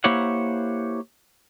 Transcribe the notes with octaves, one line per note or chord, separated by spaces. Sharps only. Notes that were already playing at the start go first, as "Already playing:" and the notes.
A#3 E4 G4 C5 C#5 F#5